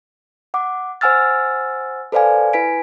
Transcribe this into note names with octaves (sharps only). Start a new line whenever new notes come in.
F#5 D6
C5 F#5 G#5 E6 F6 A6
A4 B4 C5 D5 F5 G#5
E4 B4 G#5 B6 D7